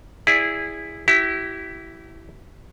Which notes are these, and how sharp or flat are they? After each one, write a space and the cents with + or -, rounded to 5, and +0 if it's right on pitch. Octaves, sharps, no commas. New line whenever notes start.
E4 +0 G#4 -20 D5 +5
E4 +0 G4 -35